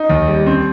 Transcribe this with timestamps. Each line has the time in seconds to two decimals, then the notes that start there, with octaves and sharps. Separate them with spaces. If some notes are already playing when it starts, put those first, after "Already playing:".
Already playing: D#4
0.09 D#2
0.28 G3
0.46 C4